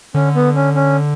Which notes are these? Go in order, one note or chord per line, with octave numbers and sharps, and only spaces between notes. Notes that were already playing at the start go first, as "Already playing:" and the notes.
D3 C#4
B3
C#4
C#4